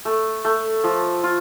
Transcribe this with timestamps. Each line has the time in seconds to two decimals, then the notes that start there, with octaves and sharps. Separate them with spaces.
0.05 A3
0.45 A3
0.84 F3
1.24 F4